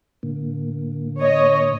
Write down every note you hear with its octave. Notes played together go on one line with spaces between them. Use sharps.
A2 D3 A#3
C#5 D#5